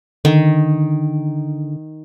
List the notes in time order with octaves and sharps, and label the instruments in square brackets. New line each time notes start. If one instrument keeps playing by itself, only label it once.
[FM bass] D3 [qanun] D#3